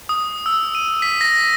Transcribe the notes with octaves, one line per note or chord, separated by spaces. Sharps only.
D#6
E6
D#7
B6
A#6